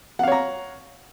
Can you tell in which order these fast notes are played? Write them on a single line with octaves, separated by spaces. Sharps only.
F#5 F5 C#5 A#5